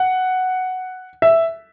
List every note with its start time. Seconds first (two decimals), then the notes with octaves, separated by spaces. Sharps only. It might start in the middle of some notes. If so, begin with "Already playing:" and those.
Already playing: F#5
1.22 E5